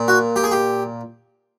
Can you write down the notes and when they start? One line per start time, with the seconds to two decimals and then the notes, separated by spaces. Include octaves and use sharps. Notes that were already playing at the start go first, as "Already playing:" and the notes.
Already playing: A#2
0.08 F#4
0.36 G4
0.44 G#4
0.52 G4